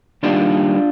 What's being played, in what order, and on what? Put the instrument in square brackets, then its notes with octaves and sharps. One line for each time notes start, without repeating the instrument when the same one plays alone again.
[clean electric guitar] D#2 D#3 G3 D4 F4